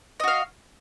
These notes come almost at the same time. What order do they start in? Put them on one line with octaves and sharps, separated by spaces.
D#5 F#4 F5